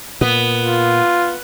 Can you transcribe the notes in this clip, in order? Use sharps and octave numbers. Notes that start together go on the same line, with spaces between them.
A#2 B3
F4